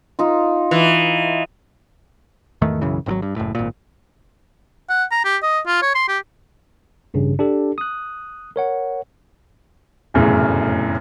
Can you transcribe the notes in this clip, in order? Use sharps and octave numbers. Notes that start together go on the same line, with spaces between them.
D#4 F4
E3
G#1 E2 D#3 A3
B1 F#2 C#3 E3
G#1 D3 F#3
G2
F#1 A2
G#1 A#2
F#5
A#5
G4
D#5
F4
C#5
C6
G4
A1 G2 C#3
D4 G4 A4
D#6 F#6
A#4 C#5 F#5
F1 B1 F#2 A2 C#3 E3